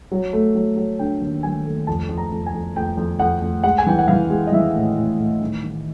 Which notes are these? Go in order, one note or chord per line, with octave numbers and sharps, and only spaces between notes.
F#3
A3
F#3
F#3
D3 G5
D#2
F#3 G#5
A3
F2 A5
F2
A#5
F2
G#5
F2
F2 G5
F2
F2 F#5
F2
G#3 F#5
G#5
E3 G5
F#5
E3 F5
G#3
D#5
E3 E5
A2
A2
A2
D#3
D#3